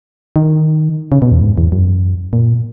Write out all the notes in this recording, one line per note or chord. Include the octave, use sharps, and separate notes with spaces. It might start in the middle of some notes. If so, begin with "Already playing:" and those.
D#3
C#3
B2
E2
G#2
E2
F#2
A#2